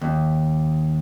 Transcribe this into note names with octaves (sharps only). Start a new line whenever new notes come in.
D#2